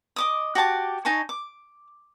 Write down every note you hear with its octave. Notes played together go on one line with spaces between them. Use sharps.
D#5 D6 D#6
F#4 G4 A5 D6
D#4 G#5 A5 C#6
D6